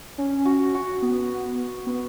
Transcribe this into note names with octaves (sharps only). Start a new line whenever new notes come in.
C#4
F#4
F#4
B3
B3